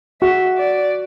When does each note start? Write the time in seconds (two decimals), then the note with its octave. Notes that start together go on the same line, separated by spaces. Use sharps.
0.21 F#4 E5
0.58 D5